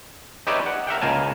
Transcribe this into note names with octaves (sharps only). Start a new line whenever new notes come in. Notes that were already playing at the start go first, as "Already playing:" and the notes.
D#4 G4 B4 C#5 D5 E5
F#5
A#4 E5 F#5 G5
C#2 A#3 A#4 G#5 A5